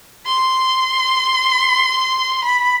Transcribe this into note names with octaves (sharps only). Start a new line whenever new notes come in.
C6
B5